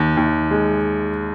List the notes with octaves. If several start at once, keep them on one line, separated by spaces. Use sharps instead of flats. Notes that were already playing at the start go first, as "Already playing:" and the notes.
Already playing: D#2
D#2
G#3